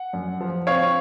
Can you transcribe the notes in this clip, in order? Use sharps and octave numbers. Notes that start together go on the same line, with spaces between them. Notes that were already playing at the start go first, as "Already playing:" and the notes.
Already playing: F#5
F#2
F3
C4 C#5 F5